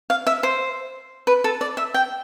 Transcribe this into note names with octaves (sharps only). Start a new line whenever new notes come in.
F5
E5
C5
B4
A4
D5
E5
G5